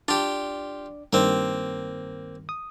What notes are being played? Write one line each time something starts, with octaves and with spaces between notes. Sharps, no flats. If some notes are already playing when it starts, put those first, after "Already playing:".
D4 F4 G4 D5 D6
G2 D#3 A#3 C4
D#6